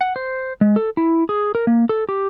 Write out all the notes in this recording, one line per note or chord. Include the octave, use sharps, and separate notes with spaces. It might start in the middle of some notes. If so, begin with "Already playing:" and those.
F#5
C5
G#3
A4
E4
G#4
A#4
A#3
A4
G4